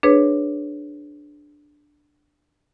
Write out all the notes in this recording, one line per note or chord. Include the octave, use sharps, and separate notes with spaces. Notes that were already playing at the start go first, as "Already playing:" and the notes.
D4 G#4 B4 C#5